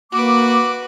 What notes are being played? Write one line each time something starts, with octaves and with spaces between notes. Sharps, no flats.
A#3 F#4 B4 D6